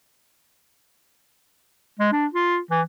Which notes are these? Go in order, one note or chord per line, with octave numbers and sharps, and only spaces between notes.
G#3
D4
F4
E3